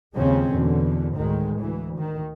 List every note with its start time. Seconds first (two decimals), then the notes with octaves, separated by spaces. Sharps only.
0.14 D#2 C#3 F3 G#3 C4 C#4
0.53 E2 B2 D3
1.15 D2 A2 D#3 G#3
1.59 D2 E3
1.98 D#3